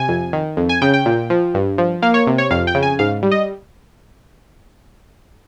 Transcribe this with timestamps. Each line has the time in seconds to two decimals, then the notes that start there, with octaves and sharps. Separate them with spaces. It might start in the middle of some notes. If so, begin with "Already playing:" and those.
Already playing: C3 G#5
0.09 F2
0.33 D#3
0.57 F2
0.69 G#5
0.82 C#3 G5
0.94 G5
1.06 A#2
1.30 F3
1.54 G2
1.78 F3
2.02 A#3 F5
2.14 C#5
2.27 C3
2.38 C#5
2.51 F2 F5
2.67 G5
2.75 C#3
2.83 G#5
2.99 G#2 F5
3.23 G3
3.31 D#5